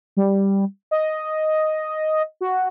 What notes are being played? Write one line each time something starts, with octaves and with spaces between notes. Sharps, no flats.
G3
D#5
F#4